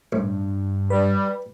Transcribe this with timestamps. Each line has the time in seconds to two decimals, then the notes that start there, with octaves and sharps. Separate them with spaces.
0.12 A1 G2
0.90 G3 B4